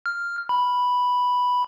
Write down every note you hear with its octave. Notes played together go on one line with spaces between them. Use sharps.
F6
B5